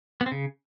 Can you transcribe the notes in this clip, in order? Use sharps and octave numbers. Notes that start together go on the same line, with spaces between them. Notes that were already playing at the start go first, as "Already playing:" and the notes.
B3
C4
C#3